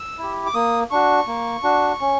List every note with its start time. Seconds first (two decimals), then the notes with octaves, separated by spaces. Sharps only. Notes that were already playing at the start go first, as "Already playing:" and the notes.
Already playing: E6
0.18 E4 G4
0.46 D6
0.54 A#3 D#6
0.91 D4 F#4 C#6
1.28 A#3
1.63 D4 F#4
2.01 C#4